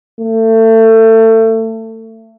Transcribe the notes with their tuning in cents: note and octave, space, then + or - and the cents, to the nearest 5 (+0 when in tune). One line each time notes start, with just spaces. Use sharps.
A3 +30